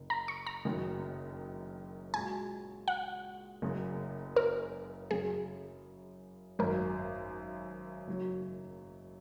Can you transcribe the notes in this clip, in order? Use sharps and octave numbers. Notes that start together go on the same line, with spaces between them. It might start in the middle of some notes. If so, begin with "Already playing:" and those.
Already playing: F#1
A#5
C#6
A#5
F#1 F#2 D#3 F#3
A#2 G#3 F#4 G#5
F#5
F#1 F#2 C#3
A#4
F#2 C#3 F#3 G#4
G#1 F#2 F#3 A#4
F#1 F#2 F#3